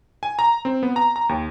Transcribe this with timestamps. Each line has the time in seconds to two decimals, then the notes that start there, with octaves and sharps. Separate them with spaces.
0.23 G#5
0.39 A#5
0.65 C4
0.83 B3
0.96 A#5
1.16 A#5
1.29 D#2